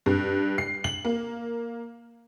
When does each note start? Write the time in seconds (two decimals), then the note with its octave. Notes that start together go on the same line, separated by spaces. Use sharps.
0.06 G2
0.58 C7
0.84 F#7
1.05 A#3